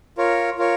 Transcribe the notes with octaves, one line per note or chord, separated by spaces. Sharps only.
F4 A#4 C#5
F4 A#4 C#5